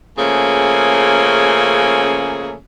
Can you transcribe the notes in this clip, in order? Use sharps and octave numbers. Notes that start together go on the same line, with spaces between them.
C#3 F3 A3 A#3 C#4 G#4